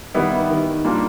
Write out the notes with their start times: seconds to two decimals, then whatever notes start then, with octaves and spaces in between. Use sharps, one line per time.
0.14 D#3 G3 B3 E4
0.50 D#3
0.85 G3 A#3 D4 F4